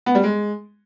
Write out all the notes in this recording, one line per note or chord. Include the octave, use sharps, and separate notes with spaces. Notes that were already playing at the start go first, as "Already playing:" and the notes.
B3
G3
G#3